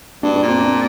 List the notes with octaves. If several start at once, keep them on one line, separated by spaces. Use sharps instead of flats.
G2 D4
D4
A#2
C4
D4